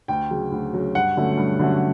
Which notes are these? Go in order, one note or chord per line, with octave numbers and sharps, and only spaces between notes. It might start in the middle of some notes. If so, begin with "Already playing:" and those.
D2 G5
C#3 F#3
D2
C#3 F#3
G2 F#5
D3 F#3 A3 C#4
G2
D3 F#3 A3 C#4